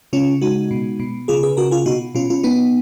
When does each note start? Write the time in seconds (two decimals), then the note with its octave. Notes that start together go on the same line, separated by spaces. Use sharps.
0.13 C#3 C#4 F4
0.41 G#3 D#4 F#4
0.71 B2
1.00 B2
1.28 C#3 F4 G#4
1.43 G#4 B4
1.57 C#3 F#4 A#4
1.71 F4 G#4
1.86 B2 D#4 F#4
2.15 B2 C#4 F4
2.30 C#4 F4
2.43 B2 B3 D#4